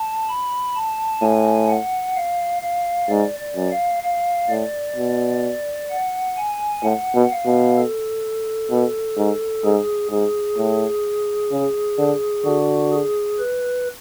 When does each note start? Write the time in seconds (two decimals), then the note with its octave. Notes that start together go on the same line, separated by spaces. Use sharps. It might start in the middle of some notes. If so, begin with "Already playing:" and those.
Already playing: A5
0.28 B5
0.75 A5
1.22 A2 G#5
1.69 F#5
2.15 F5
2.62 F5
3.09 G#2 D5
3.40 D5
3.56 F#2
3.71 F5
4.03 F5
4.49 A2 D5
4.96 B2
5.90 F#5
6.37 G#5
6.83 A2 F#5
7.15 B2
7.31 F5
7.46 B2
7.77 A4
8.71 B2
9.17 G#2
9.64 G#2 G#4
10.11 G#2 G#4
10.58 A2
11.52 C#3
11.98 D3
12.45 D3 F#4
12.93 G#4
13.39 B4